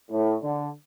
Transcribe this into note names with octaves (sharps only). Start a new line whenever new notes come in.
A2
D3